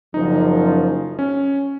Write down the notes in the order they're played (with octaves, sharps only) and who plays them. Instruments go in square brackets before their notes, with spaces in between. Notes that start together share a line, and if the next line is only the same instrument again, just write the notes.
[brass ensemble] F#1 F#2 F3 [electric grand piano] D#4
[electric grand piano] C#4